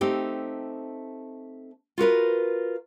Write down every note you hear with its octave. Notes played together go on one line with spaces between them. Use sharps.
A3 C4 D#4 G4
F4 F#4 A#4 B4